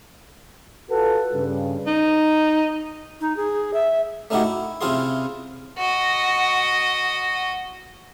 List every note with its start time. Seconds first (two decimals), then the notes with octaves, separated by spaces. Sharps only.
0.90 F4 F#4 A4 B4
1.33 G2 C#3
1.87 D#4
3.21 D#4
3.37 G#4
3.74 E5
4.30 A3 C#4 D#4 E4 F#4 G4
4.44 E4
4.81 C3 C#4 E4 F4 G#4 C6
5.78 F#4 D#5